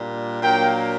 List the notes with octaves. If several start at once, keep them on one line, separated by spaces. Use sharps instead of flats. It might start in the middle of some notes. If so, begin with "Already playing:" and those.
Already playing: A#2 G3 D4
A#2 F#3 A#3 D4 G5